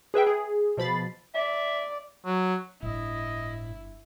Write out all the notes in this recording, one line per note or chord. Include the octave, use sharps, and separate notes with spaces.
G#4 B4 E5 G5
G#4
B2 F3 B5 A6 C7
D5 E5
F#3
G1 A2 E4 D#5